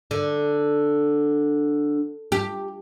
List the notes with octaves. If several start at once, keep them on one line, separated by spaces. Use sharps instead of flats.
D3
G4